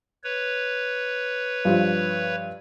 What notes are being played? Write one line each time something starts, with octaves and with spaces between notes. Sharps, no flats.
B4 C#5
G2 F3